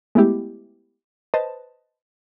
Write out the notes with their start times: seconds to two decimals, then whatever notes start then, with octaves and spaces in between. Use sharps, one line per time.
0.15 G#3 A3 B3 E4 G4
1.34 B4 C5 D#5 A5